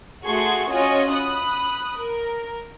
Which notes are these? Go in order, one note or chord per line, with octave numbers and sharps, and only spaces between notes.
A3 F#4 G#4 C6 C#6 G#6
C#4 F4 F#4 C#5 D#5 G#5
B5 D#6 F#6
A#4